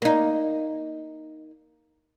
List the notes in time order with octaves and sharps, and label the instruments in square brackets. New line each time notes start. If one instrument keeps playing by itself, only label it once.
[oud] A#3 D#4